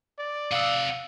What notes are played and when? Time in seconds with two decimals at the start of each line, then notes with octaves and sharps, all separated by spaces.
0.18 D5
0.51 C3 F5 F#5 D#6 E6